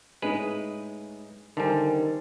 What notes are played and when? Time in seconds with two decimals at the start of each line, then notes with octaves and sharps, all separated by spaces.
0.22 A2 G#3 D#4 G#4 B4
1.57 D3 D#3 G3 C5 G#5 A5